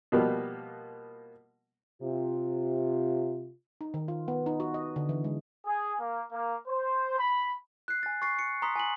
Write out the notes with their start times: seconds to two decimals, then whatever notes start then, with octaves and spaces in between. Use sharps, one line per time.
0.12 B2 F3 G3 A#3 B3
2.02 C3 F4
3.81 D#4
3.94 D#3
4.08 F4
4.28 B3
4.46 D#4
4.60 F#4
4.74 D#5
4.96 D3
5.09 E3
5.24 G#3
5.67 G#4
6.00 A#3
6.32 A#3
6.67 C5
7.19 B5
7.88 F#6 C7
8.03 G#5 A6
8.22 C#6 A6 C7
8.39 C#7
8.62 A#5 C6 D#6 B6
8.76 G#5 B6 F#7